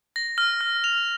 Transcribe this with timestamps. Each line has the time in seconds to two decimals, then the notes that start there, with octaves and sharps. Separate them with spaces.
0.16 A#6
0.38 F6
0.61 F6
0.84 F7